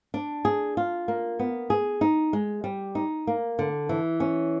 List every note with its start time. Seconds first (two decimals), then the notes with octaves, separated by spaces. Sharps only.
0.14 D4
0.45 G#4
0.77 F4
1.08 A#3
1.39 B3
1.70 G#4
2.01 D#4
2.33 G#3
2.64 G3
2.95 D#4
3.27 A#3
3.59 D3
3.89 E3
4.20 C#4